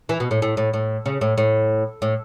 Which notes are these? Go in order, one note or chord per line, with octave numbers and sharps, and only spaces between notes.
E3
B2
A2
A2
A2
A2
C#3
A2
A2
A2